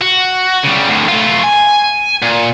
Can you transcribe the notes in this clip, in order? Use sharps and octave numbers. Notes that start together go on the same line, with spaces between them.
F#4
C#3 G3
D2 A2
A3 F4
G#5
A#2